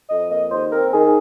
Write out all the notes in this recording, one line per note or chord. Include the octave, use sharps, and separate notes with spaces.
F2 D#5
A#3 D#5
D#2 C5
C4 A#4
D#3 G#4